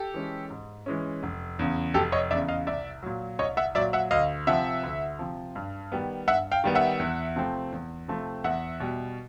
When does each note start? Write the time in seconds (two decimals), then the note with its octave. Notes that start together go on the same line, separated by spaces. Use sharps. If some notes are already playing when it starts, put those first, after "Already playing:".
Already playing: G4 A4
0.14 E3 G#3 C#4
0.50 G#2
0.86 E3 G#3 C#4
1.23 F1
1.59 E2 C#3
1.94 F1 G4 A4
2.12 C#5 D#5
2.31 E2 C#3 D5 E5
2.48 D#5 F5
2.67 C2 D5 E5
3.03 A#2 F#3
3.39 C2 C#5 D#5
3.57 E5 F#5
3.75 A#2 F#3 D5 E5
3.93 E5 F#5
4.11 D2 D#5 F5
4.47 C3 F3 E5 F#5
4.83 D2
5.19 C3 F3
5.56 G2
5.92 D#3 G3 B3
6.28 G2 E5 F#5
6.52 F5 G5
6.64 D#3 G3 B3
6.75 E5 F#5
7.00 E2
7.36 C3 F3 A3 C4
7.72 E2
8.08 C3 F3 A3 C4
8.44 E2 E5 F#5
8.80 B2 G3